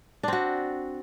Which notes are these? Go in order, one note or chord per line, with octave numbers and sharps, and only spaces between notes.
C4 D4 F#4